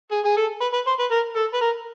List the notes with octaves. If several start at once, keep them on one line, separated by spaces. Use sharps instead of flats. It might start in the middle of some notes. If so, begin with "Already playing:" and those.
G#4
G#4
A4
B4
B4
C5
B4
A#4
A4
B4
A#4